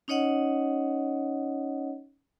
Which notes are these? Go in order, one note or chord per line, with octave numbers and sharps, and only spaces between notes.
C#4 D#4 C#5 D#5 F#5